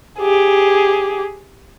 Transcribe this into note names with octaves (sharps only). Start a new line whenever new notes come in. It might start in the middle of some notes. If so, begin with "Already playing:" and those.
G4 G#4